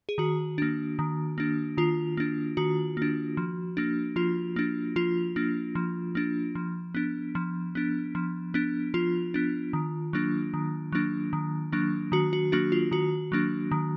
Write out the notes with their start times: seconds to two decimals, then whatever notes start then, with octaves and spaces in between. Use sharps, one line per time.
0.09 G#4
0.18 D#3 F#4
0.58 A#3 D4
0.99 D#3
1.38 A#3 D4
1.77 D#3 F4
2.17 A#3 D4
2.57 D#3 F#4
2.97 A#3 D4
3.37 F3
3.77 A#3 D4
4.16 F3 F4
4.56 A#3 D4
4.96 F3 F4
5.36 A#3 D4
5.75 F3
6.15 A#3 D4
6.55 F3
6.95 B3 D4
7.35 F3
7.75 B3 D4
8.15 F3
8.54 B3 D4
8.94 F3 F4
9.34 B3 D4
9.73 D#3
10.13 F#3 A#3 D4
10.54 D#3
10.92 F#3 A#3 D4
11.33 D#3
11.72 F#3 A#3 D4
12.12 D#3 F#4
12.33 F#4
12.52 F#3 A#3 D4 F#4
12.72 F4
12.91 D#3 F#4
13.32 F#3 A#3 D4
13.71 D#3